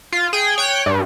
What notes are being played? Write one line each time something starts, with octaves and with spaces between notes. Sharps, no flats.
F4
G#4 G5
C#5 G5 F#6
G2